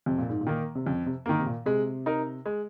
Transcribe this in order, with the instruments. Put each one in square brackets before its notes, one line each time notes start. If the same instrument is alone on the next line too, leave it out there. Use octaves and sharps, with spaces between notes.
[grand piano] F2 [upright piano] C3
[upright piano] A#2
G#2
A#2
[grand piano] D#3 A#3
[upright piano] C3
[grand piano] F2 [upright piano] C#3
[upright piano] C3
[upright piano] G#2 [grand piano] D#3 A#3
[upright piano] C3
A#2
[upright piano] C3 [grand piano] G#3
[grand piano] D#4 A#4
G#3